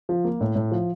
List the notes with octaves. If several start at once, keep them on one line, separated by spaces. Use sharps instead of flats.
F3
A#3
A2
A2
F3